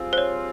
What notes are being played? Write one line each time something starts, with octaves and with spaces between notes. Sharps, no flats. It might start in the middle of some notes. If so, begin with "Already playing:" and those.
Already playing: G3 C4 F4 G#4
C5
C#5